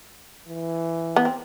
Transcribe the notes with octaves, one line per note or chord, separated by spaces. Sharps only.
E3
B3
C4